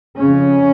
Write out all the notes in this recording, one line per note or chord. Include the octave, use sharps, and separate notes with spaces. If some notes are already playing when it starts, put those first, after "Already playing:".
F2 C#3 C#4